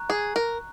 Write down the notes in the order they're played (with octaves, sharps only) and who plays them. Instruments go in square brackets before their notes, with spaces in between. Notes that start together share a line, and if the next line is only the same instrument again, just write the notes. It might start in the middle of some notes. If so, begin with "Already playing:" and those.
Already playing: [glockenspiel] A#5 C#6 F#6
[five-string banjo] G#4
A#4